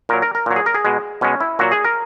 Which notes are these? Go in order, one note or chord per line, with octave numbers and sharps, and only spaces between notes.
A#2 F#3 A#4
A#4
A#4
A#2 F#3
G#4
A#4
G#4
B2 G#3
B2 G#3 C#4
E4
A#2 F#3 F#4
G#4
A#4